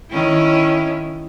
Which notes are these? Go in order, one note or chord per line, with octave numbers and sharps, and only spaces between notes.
D#3 C#4 E4